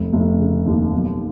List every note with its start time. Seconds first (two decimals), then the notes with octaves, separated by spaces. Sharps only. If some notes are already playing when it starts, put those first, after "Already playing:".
Already playing: F1
0.13 F1
0.39 C#3
0.66 D#2
0.93 B1